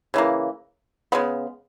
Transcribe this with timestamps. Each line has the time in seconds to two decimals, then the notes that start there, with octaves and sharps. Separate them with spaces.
0.14 C#3 E3 A#3
1.12 C#3 G#3 B3